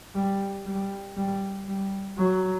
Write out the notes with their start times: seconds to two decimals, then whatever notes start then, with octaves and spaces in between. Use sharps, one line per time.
0.15 G3
0.66 G3
1.17 G3
1.68 G3
2.18 F#3